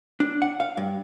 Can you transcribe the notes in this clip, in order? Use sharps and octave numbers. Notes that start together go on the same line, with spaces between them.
D4
F#5
F5
G2